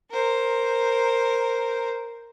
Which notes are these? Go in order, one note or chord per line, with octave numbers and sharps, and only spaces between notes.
A#4 C5